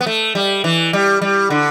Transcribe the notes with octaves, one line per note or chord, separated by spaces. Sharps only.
B3
A3
G3
E3
G3
G3
D3